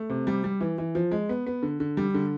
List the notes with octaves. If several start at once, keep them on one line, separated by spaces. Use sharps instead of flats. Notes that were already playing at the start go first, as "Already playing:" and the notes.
Already playing: A3
C3
G3
G3
E3
E3
F3
G#3
B3
B3
D3
D3
G3
D3